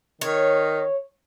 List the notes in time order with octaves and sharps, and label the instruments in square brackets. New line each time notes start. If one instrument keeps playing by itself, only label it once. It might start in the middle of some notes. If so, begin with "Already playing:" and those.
[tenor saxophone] D#3 [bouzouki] C#5